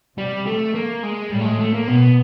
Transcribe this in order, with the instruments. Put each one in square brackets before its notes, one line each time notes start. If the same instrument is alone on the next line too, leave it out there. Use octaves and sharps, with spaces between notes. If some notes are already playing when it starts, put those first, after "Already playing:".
[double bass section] C3 [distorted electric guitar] G3
[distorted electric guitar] A3
A#3
G#3
[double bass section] A2 [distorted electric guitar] G3
[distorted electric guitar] A3
G#3
A3
A#3
[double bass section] B2 [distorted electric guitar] B3